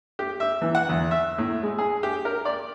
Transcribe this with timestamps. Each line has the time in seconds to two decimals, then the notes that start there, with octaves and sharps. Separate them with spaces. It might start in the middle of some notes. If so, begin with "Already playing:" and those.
0.19 G4
0.40 E5
0.62 E3
0.75 F#5
0.89 E2
1.11 E5
1.38 A2
1.63 G#3
1.78 G#4
2.03 G4
2.25 A#4
2.45 D5